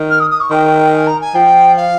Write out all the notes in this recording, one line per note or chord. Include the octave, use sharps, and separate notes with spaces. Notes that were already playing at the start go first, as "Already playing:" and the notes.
Already playing: D#3
F6
D#6
D#6
C#6
D#3 G5
G#5
A#5
G#5
F3 G5
F5